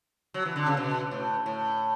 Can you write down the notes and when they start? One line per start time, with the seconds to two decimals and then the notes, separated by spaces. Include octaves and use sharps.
0.34 F#3
0.45 E3
0.56 D3
0.66 C#3
0.77 B2
1.11 A2
1.46 A2